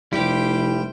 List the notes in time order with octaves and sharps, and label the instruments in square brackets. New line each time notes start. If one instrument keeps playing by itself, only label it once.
[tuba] F1 [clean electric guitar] G3 G4 [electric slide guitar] E4 [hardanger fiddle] C5 G5